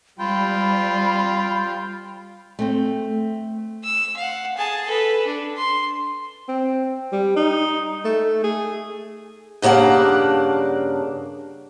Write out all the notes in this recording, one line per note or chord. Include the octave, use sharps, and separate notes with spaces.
G3 F4 G5 B5
A3 C4 C5
E6
F5 F#5
G#4 A5
A4 B4
D4
C6
C4
G3
D#4
A3
G#4
G2 C#3 A#3 D4 F#5